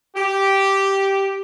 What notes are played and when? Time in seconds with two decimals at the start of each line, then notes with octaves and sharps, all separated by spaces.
0.17 G4